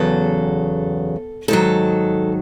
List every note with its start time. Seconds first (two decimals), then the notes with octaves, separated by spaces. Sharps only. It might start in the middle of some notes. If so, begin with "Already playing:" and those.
Already playing: E2 C#3 F#3 A4
1.48 G#2 D#3 F#3 A4